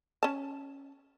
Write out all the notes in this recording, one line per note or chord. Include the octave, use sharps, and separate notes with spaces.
C#4 A5